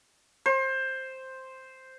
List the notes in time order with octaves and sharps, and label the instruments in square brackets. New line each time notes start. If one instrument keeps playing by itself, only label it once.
[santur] C5